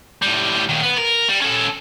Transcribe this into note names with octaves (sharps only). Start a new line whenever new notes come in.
A2 G3
A#2 D#3
B3 B4
A#4
G3
C#4 A4